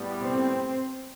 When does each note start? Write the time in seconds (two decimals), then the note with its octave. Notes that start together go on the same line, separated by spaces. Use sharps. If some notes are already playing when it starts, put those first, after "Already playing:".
Already playing: A2 G3 B3
0.22 C4